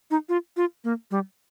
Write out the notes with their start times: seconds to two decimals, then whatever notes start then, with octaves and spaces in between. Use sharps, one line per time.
0.11 D#4
0.29 F4
0.57 F4
0.84 A#3
1.11 G3